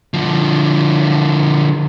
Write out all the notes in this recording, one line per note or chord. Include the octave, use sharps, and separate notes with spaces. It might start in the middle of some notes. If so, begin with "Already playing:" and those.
D3 F3